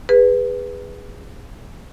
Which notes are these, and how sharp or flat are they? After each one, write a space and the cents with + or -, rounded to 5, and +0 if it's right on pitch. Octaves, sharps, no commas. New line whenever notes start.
G#4 -25 B4 +0